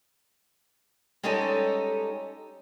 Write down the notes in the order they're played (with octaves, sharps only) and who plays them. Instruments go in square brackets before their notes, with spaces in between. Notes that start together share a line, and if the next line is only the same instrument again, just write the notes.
[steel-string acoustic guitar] G3 G#3 C#4 D#4 G4 A4